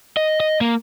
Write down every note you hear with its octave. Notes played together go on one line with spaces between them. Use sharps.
D#5
D#5
A#3